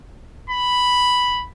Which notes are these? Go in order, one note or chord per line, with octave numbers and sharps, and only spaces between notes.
B5